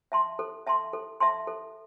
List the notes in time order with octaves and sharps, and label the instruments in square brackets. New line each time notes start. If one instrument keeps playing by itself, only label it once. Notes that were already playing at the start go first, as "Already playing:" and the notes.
[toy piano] E5 A5 C6
A4
E5 A5 C6
A4
E5 A5 C6
A4